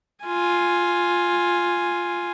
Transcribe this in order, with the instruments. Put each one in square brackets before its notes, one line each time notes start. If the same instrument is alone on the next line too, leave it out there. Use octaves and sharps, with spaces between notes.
[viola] F4 G#5